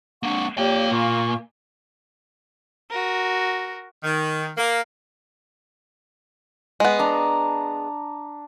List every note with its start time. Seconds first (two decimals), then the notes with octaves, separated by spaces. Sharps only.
0.23 A#3 C4 D4 F#5 C#6
0.58 A#3 F4 G4 C#5 D5 G5
0.91 A#2 F4 C#6
2.91 F#4 A#4
4.04 D#3
4.57 A#3
6.80 G#3 B3
6.99 D4 A#5